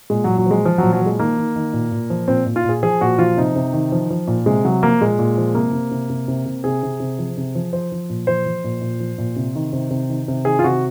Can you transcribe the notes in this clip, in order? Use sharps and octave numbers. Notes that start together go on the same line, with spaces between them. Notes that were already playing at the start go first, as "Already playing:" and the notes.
A#2 G#3
A#2 F#3
F#3
F3 G#3
F3
A#2 F#3
F#3
F3 G#3
D#3 A#3
D#3
D#3
A#2
A#2
F3
A#2 C4
A#2
F4
A#2 G#4
F3 G#4
A#2 F#4
F3 F4
C3 D#4
C3
D#3
F3
F3
A#2
C3 G#3
C3 F#3
F3 A#3
A#2 G#3
A#2
F3
C3 A#3
C3
C3
C3
C3
C3
C3 G#4
C3
C3
F3
C3
F3
F3 C5
F3
A#2
F3 C5
F3
A#2
A#2
F3
A#2
C3
D#3
C3
C3
D#3
C3
D#3 G#4
F4
C3 F#4